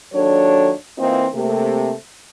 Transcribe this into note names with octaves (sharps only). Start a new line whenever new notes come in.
D#2 F#3 D4 A4 C#5
E3 A#3 C4 D#4 F4
C3 A3 A#3